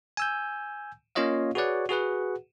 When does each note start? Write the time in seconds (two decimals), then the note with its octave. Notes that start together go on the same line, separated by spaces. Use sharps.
0.17 G#5 E6 G6
1.15 A#3 C#4 F4 C#5 D#5 F5
1.55 F#4 G#4 B4 C#5 D5 F#5
1.89 F#4 G#4 B4 F#5